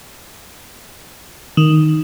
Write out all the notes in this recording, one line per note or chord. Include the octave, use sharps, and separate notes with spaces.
D#3